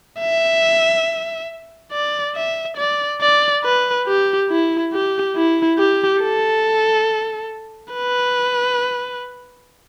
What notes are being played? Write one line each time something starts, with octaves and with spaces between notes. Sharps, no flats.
E5
D5
E5
D5
D5
B4
G4
E4
G4
E4
G4
A4
B4